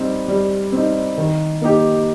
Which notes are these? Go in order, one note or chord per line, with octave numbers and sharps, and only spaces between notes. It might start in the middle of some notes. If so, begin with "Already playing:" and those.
Already playing: G3 C4 D#4
G3
C4 D#4
D#3
A#3 D#4 G4